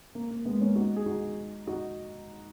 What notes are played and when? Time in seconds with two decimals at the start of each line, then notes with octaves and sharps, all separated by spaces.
0.15 A#3
0.31 A#3
0.45 G#3 B3
0.61 A#3 C#4
0.75 D#4 F#4
0.96 G#4
1.06 D#4 F#4
1.67 D#4 F#4